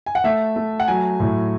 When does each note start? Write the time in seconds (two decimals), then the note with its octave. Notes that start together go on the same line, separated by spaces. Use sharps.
0.06 G#5
0.15 F#5
0.24 A3 E5
0.56 A3
0.80 F#5
0.88 F#3 G#5
1.20 A2